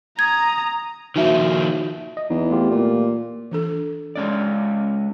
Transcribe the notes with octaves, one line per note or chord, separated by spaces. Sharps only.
A#5 D#6 G#6
D#3 F3 A#3 D#4 F#4 E5
D#5
E2 D#4
A3 F4 G4
A#2
E3 D4 A4
G#3 C#4 D5